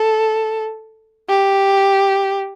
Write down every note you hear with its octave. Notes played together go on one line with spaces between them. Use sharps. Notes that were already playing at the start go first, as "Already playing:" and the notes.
Already playing: A4
G4